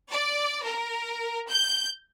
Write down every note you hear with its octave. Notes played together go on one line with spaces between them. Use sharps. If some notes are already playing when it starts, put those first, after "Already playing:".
D5
A#4
G6